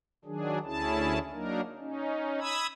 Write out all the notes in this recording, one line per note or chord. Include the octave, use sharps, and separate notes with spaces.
D#3 F#3 D4 G#4
D2 C#4 E4 G#4 A5
F#3 A#3 D4 D#4 A#4
C#4 D#4
B5 D#6 E6 G#6